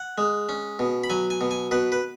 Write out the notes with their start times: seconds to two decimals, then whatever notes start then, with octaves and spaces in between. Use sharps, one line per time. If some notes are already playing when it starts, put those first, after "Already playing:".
Already playing: F#5
0.18 G#3
0.49 C#4
0.79 B2
1.04 B5
1.10 F#3 G#5
1.30 G#5
1.41 B2
1.51 G#5
1.71 B2 B4
1.92 B4